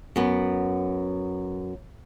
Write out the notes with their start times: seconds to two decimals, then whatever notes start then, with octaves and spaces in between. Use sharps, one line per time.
0.16 F#2 B3